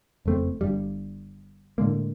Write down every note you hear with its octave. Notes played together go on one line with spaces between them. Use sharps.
F#1 F2 A3 C4
G1 G2 G3
A2 D3 G#3 A#3